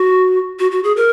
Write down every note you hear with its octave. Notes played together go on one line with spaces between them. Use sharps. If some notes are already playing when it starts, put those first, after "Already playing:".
Already playing: F#4
F#4
F#4
G#4
A#4